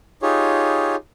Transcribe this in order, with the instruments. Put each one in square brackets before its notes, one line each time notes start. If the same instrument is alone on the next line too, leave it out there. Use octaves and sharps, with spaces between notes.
[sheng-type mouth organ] D#4 F4 G4 G#4 C#5